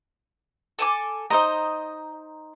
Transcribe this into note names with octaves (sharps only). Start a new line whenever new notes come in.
A4 G#5 D6
D#4 C5 D#5 A#5